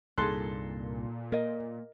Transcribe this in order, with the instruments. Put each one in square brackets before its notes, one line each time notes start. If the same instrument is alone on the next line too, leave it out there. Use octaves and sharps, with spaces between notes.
[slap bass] C2 G2 [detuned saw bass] A#2 [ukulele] D#4 G#4 [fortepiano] A4 C6 F#6
[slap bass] A#3 [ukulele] A#4 D#5